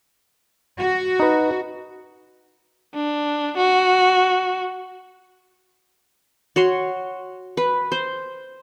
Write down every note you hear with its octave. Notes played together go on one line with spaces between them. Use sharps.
F#4
D#4 B4
D4
F#4
F#4 C#5 C6
B4
C5